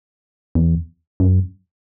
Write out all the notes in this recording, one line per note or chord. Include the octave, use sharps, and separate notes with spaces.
E2
F#2